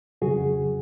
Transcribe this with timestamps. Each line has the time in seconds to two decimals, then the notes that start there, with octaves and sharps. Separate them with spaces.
0.22 F2 C#3 F#3 F#4 G#4